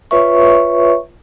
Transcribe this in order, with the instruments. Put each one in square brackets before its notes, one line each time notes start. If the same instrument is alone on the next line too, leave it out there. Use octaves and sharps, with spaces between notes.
[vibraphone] F4 B4 C#5 E5 C#6